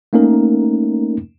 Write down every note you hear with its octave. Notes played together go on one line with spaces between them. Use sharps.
A3 A#3 C#4 D#4 A#4